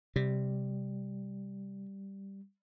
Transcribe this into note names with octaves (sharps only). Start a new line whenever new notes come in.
C3 G3